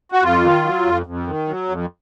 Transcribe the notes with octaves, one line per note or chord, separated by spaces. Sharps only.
F#4
F2 F4
D#3
F#3
F2
F2
D#3
F#3
F2